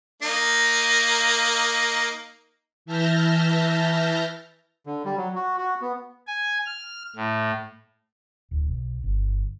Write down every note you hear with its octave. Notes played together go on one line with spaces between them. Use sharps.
A#3 D#4
E3 E5 A5 F6 G6 A#6
D3
G3
F#3
F#4
F#4
B3
G#5
F6
A2
D1
B1
G1